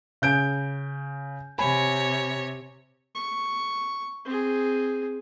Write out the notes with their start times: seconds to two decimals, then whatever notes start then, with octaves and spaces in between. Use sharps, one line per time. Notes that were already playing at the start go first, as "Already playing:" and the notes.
0.22 C#3 G6 D7
1.59 C3 C#5 G#5 B5
3.15 C#6
4.25 C4 G#4